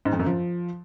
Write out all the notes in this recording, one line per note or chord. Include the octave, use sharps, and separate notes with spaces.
G#2
F2
F#2
F3